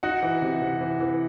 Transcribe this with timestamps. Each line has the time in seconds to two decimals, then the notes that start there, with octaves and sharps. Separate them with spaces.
0.03 D#4 F#4 F#5
0.22 E3
0.42 C3
0.62 C3
0.81 E3
1.00 E3